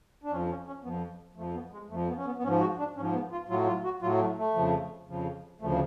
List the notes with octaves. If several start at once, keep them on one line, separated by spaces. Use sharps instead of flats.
D4
F2 F3 C#4
C#4
C#4
F2 F3 B3
F2 F3 A3
B3
G#3
F2 F3 A3
B3
C#4
B3
B3
G#2 F3 C#4
F#4
D4
G#2 F3 C#4
B3
F4
A2 F#3 F4
F4
F#4
A2 F#3 F4
A3
A3
F2 C#3 F3
F2 C#3 F3
D2 C#3 F3 A3